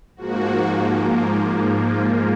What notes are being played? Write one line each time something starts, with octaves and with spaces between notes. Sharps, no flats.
G#2 F3 A#3 F#4
F4